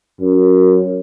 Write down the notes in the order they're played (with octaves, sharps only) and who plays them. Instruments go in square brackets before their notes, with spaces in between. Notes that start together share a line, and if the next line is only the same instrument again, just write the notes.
[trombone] F#2